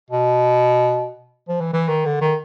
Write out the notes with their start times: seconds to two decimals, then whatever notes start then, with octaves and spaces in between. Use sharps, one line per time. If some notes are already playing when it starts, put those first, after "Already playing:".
0.10 B2
1.48 F3
1.61 E3
1.73 E3
1.88 D#3
2.06 D3
2.21 D#3